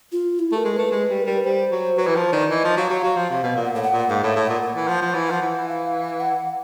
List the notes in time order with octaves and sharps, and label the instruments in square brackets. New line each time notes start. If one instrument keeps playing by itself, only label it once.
[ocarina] F4
E4
[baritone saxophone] A3
[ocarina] A#4
[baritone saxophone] G#3
[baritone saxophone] A3 [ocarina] B4
[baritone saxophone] G#3
G3
[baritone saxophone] G3 [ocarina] A#4
[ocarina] B4
[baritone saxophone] G3 [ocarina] C5
[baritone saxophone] F#3
[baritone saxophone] F#3 [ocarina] B4
[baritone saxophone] E3
[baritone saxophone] F3 [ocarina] C5
[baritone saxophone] D#3 [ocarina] D5
[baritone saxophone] E3 [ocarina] D#5
[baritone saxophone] F3
[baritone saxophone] F#3 [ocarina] F5
[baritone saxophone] F#3
F#3
F3
C3
B2
A#2
[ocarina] F#5
[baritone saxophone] A2 [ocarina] F5
[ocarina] F#5
[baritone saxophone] A#2
[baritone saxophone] G#2 [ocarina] F5
[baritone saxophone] A2 [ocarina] E5
[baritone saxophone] A2
[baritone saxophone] A#2 [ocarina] F#5
[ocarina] F#5
[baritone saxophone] E3
[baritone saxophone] F3 [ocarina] F#5
[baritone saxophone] F3
[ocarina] F#5
[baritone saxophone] E3
[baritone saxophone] F3 [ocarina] F#5
[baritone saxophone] E3
[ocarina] F5
F#5